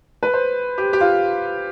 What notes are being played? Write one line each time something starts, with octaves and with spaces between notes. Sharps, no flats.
B4
C5
G4
G4
F4